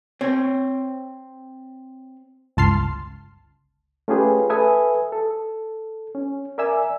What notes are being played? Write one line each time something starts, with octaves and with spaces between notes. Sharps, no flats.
C4 C#5
G1 C#2 A5 C6 F6 C7
A3 C#4 F4 G4 G#4 B4
A4 B4 E5 G#5 D#6
A4
C#4
A#4 D5 E5 G#5 E6